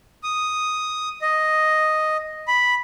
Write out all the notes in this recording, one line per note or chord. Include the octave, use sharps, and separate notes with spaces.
D#6
D#5
B5